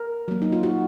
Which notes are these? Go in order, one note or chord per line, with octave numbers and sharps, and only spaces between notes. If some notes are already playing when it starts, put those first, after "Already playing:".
Already playing: A#4
F#3 A#3
D#4
F4
F#4